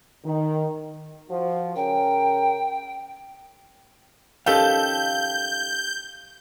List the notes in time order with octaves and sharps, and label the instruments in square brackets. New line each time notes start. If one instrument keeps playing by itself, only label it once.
[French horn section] D#3
[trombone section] F3 F#4
[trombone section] C#3 C#4 A#4 [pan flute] G5
[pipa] D#3 F3 A4 [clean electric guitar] C#4 G4 F5 [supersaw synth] G6